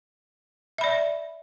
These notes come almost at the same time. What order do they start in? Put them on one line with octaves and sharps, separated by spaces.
E5 B5 D5